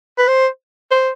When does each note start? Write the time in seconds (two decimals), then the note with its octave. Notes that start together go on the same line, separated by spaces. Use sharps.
0.18 B4
0.28 C5
0.91 C5